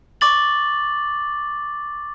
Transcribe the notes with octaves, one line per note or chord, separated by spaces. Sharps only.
C#6 D6 A6 F#7